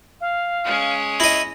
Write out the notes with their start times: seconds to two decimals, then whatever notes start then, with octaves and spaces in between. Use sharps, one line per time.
0.20 F5
0.65 G#3 C#4
1.20 E4 D#5 A#6